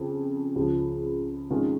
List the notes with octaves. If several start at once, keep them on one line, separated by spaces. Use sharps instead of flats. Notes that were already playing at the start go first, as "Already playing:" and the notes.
Already playing: F2 C#3 F3 C4
C#2 C#3 F3
F2 D#3 G#3 C#4 F4